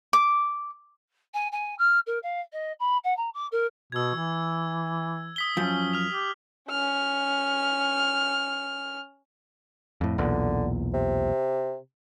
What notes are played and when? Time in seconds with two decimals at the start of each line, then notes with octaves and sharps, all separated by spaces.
0.13 D6
1.34 G#5
1.52 G#5
1.78 F6
2.06 A#4
2.23 F5
2.52 D#5
2.79 B5
3.04 F#5
3.17 A#5
3.34 D6
3.52 A#4
3.92 B2 E6 G#6
4.15 E3
5.36 D#6 B6 G7
5.57 F#2 F3 C#4
5.93 F6 F7
6.09 G4
6.70 C#4 F6
10.01 F2 A2
10.18 B1 E2 A#2 D3
10.94 C3